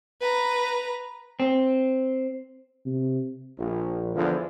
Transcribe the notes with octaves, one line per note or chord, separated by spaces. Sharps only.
B4 A#5
C4
C3
A#1
E2 D3 F3